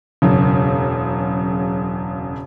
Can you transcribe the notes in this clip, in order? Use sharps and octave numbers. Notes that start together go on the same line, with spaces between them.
E1 F#2 C#3